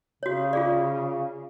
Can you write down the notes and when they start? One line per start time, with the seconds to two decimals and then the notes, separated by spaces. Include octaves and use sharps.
0.23 C#3 F#4 C#5
0.53 F4 G#4 D5